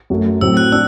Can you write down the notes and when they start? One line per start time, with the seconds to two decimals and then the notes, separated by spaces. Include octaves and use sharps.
0.10 F#2 F#3 A3
0.41 A2 F#3 C4 E6
0.57 F#6
0.72 D4 E6